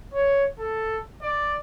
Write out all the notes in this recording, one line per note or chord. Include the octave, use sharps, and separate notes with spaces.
C#5
A4
D5